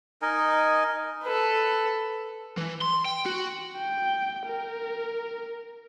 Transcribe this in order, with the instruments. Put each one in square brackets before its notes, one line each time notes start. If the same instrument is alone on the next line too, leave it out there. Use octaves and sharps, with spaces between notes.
[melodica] D#4 A#4 D#5 G#5
[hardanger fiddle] A4 B4
[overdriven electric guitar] E3
C6
G5
F#4
[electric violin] G5
A#4